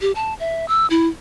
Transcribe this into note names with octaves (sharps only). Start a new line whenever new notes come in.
G4
A5
E5
E6
E4